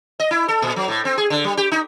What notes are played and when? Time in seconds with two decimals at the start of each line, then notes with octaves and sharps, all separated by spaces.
0.20 D#5
0.31 E4
0.48 A4
0.62 A#2
0.76 F#3
0.88 A2
1.05 C4
1.18 G#4
1.30 D3
1.44 G3
1.57 G4
1.72 D#4